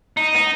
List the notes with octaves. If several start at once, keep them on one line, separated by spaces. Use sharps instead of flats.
D#4
D#4